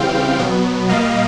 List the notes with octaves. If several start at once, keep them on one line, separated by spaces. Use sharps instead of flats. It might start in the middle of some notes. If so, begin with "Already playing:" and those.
Already playing: C#3 E3 G3 C4 F5 G5
B2 F#3 B3
A#2 G3 A#3 D#5 F5